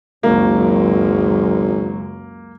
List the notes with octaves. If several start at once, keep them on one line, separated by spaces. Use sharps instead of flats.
G#1 C#2 F#2 F#3 A#3